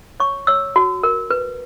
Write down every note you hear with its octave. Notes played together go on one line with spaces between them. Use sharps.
C#5 C#6
C#5 E6
F#4
A#4
B4